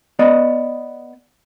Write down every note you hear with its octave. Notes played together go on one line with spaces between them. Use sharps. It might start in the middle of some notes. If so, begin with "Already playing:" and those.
B3 D5 D#5